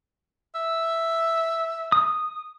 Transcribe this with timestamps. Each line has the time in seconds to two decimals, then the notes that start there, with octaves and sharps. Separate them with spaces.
0.55 E5
1.92 D#6